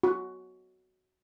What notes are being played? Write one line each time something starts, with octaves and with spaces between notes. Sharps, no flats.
F#4